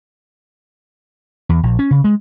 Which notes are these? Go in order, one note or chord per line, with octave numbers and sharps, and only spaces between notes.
E2
A#1
C#4
C#3
G#3